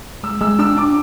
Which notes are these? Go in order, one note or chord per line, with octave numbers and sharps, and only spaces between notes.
G#3 E6
G#3 E6
D4 E6
D4 D6